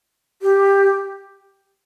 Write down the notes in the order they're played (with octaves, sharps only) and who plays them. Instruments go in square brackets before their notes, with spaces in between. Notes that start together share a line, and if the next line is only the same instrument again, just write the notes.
[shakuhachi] G4